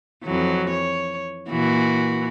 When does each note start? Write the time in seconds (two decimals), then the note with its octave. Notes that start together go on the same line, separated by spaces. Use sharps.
0.24 F2 E3 F#3
0.71 C#5
1.50 A#2 E3 F#4